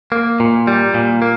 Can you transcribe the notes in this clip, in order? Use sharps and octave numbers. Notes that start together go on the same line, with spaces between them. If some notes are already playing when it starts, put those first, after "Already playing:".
A#3
A#2
G3
A#2
A#3